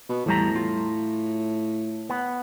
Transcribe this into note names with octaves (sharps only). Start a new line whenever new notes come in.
B2
E2 A2 G3 A#5
F4
B3